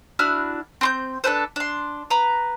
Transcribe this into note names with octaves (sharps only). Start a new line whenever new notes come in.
D4 E4 F#4 F6
C4 C6 G6
D4 A4 B4 C5
D4 C6
B4 A#5